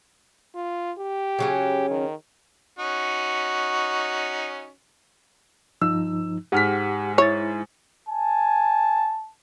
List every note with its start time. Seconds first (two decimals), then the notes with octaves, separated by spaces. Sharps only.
0.55 F4
0.98 G4
1.39 C#3 F#3 C#4
1.90 D#3
2.79 C#4 D#4 F#4
5.81 G2 F3 D#4 E6
6.52 G#2 G4 F#5 F6 B6
7.18 E4 C#5 A6
8.09 G#5 A5